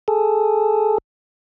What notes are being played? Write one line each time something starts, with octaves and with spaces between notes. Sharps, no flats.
G#4 A4